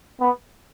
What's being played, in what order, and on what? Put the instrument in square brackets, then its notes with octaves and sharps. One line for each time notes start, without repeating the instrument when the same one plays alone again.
[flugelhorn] B3